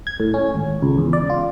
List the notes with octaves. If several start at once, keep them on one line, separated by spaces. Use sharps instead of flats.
G#6
A2
C#4
G#1
C#2
E2
D5
F4